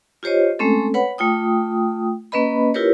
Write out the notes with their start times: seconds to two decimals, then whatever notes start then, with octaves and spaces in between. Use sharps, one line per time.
0.23 F4 G4 C5 C#5 D#5
0.59 G#3 A3 C4 C#4 A4
0.94 B4 C#5 F#5 B5
1.18 A3 F4 G5 D#6
2.32 A#3 C#4 B4 D#5 B5
2.74 E4 F4 G4 A#4 B4 C#5